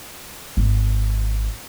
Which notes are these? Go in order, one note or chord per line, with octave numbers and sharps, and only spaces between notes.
G#1